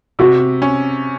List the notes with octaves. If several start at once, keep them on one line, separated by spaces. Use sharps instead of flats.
C3 F#4
C#4